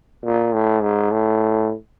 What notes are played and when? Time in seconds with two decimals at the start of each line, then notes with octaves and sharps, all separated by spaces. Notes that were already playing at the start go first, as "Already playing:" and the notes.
0.24 A#2
0.53 A2
0.82 G#2
1.11 A2